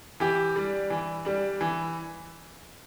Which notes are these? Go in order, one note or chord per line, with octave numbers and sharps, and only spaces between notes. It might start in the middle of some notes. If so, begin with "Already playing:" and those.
E3 G4
G3 D4
E3
G3 D4
E3